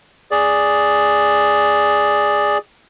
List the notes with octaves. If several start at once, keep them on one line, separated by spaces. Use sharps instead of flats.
G#4 D5